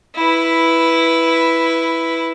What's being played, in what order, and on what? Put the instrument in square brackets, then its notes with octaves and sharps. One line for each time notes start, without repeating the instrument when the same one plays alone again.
[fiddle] E4 B4